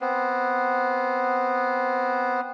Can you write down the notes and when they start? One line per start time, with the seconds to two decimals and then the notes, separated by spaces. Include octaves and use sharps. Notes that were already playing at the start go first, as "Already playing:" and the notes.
0.01 B3 C4